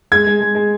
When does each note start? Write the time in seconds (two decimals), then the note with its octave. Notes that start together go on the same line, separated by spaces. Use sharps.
0.12 G#3 G#6
0.27 G#3
0.41 G#3
0.55 G#3